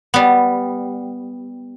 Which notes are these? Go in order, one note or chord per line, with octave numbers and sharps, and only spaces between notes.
G3 B3